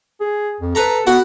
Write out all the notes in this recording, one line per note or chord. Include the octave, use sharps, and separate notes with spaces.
G#4
F2
A4 B4 A#5
B3 F#4 F#5